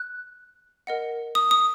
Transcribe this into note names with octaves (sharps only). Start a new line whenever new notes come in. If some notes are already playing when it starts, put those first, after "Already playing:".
Already playing: F#6
A#4 D#5 F#5
D#6
D#6